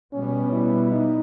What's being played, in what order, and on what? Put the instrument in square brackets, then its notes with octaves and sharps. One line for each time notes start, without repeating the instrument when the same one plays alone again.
[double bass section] B2 G3 B3 [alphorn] C#4
[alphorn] E4
D#4